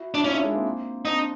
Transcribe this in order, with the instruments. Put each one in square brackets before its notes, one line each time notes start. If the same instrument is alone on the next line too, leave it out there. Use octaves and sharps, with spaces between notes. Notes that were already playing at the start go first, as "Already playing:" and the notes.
Already playing: [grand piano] E4 F#4
[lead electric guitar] D4 [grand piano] E4
[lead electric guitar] C#4 [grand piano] D#4 F4
[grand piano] D4 E4
G#3 A#3
A#3 C4
[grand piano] C4 D4 [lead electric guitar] D#4